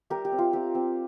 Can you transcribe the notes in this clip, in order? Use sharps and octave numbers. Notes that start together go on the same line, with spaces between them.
G3 G4 A#4
G4
C4
F4
C4 G4
C4